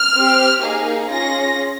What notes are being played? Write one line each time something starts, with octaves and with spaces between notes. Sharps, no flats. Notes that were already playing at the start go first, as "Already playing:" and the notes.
Already playing: F6
C4 G4
A#3 D#4 G#4
C#4 F4 G#4 A#6